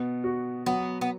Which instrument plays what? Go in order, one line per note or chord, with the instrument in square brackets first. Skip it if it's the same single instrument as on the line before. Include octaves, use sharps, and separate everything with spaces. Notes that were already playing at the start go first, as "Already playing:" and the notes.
Already playing: [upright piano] B2 [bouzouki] B3
[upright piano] F#4
[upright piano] F#3 [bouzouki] B3
[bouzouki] B3